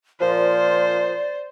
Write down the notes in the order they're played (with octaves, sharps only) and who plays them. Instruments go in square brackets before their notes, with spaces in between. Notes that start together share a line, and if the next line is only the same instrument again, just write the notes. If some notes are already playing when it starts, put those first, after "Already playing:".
[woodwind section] A#2 F3 [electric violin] C5 [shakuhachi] D5